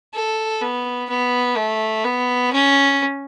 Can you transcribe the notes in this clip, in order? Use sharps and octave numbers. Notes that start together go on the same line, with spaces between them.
A4
B3
B3
A3
B3
C#4